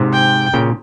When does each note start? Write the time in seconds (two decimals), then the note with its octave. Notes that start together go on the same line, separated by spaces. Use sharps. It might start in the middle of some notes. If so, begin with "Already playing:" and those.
Already playing: G#2 C3
0.13 G5
0.54 A#2 C#3